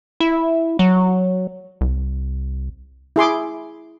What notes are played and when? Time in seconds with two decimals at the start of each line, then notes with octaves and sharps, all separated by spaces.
0.20 E4
0.79 F#3
1.81 C2
3.16 E4 G#4 C6 D6